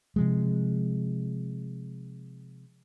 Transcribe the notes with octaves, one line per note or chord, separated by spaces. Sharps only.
C3 F3 G#3